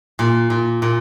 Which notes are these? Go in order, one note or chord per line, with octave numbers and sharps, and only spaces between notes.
A#2
A#2
A#2